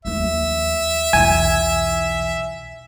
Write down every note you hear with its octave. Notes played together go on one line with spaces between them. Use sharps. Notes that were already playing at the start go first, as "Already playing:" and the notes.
D#2 F3 E5
B1 E2 G#5